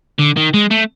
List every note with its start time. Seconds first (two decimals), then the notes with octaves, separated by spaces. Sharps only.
0.19 D3
0.37 D#3
0.54 G#3
0.71 A3